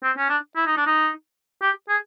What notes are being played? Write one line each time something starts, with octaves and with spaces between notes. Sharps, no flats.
C4
C#4
D4
E4
D#4
D4
D#4
G4
G#4